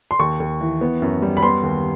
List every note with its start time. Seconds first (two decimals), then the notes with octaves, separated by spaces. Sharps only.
0.11 C6
0.19 D#2 C#6
0.40 D#2
0.61 E3
0.81 B3
1.02 F#2
1.22 G3
1.37 B5
1.43 B3 C6
1.63 D#2